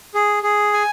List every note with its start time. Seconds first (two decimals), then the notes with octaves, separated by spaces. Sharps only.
0.15 G#4
0.43 G#4
0.73 G#5